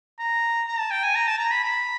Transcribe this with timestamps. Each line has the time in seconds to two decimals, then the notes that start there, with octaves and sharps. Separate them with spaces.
0.19 A#5
0.68 A#5
0.80 A5
0.91 G5
1.04 G#5
1.16 A#5
1.28 A5
1.39 A#5
1.52 B5
1.64 B5